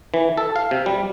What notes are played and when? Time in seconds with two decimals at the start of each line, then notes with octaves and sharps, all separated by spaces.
0.14 E3
0.37 A4
0.56 F5
0.71 C3
0.86 G3